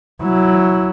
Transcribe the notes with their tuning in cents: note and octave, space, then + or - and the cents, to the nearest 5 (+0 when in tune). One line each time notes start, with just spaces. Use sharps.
F#3 +5 E4 +0